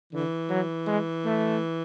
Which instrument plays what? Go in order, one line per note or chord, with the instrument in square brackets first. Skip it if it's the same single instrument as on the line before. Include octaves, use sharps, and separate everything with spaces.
[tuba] D3 [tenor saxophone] E3
[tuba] F#3
G#3
A3